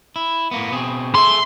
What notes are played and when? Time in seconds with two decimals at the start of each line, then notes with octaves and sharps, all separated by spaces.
0.16 E4
0.51 A2 A#3 B3
0.72 B2 C4 G#4
1.15 G#4 A4 E5 C6